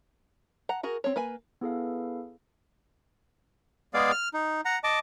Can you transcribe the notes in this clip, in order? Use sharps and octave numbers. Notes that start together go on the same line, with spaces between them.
F#5 A#5
F#4 G#4 A#4
C4 C#5
A#3 B4 G#5
B3 E4 G#4 A4 B4 F5
G#3 B3 G#4 D5 F5
F6
D#4
F#5 A#5
D#5 A5 D6